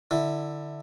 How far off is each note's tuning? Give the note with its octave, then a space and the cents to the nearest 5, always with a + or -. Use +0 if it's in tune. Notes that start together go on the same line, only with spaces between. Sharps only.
D3 +20 E4 +0